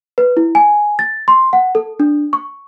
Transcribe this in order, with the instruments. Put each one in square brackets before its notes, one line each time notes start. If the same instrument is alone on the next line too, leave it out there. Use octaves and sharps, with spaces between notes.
[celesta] B4
E4
G#5
A6
C6
F#5
A4
D4
C#6